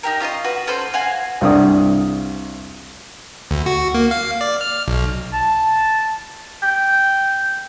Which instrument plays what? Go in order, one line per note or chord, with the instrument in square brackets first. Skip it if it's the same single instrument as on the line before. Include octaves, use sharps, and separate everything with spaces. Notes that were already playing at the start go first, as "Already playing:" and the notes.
[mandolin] D#4 G4 A#4
C#4 F4 C5 D#5
F#4 B4
C#4 A4 B4 C5
F#4 F5 G#5
[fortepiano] C2 G2 D5 D#6
[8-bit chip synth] D2
F#4
A#3
F5
D5
F6
B1
[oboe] A5
G5